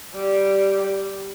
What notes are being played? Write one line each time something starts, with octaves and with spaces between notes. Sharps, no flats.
G3